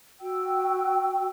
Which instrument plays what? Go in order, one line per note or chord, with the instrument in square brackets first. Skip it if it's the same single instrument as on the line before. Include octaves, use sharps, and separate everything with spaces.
[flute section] F#4 G5 E6